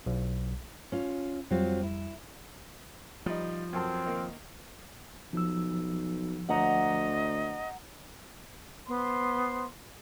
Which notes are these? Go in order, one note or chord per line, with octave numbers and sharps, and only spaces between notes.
B1
C#4 F4
F2 F#3 G3 C4 F4
E4
F3 G3 D#4
F#2 C4 A4
D#3 A#3
B1 F3 E6
D2 D#5 F#5 A#5
B3 C5 C6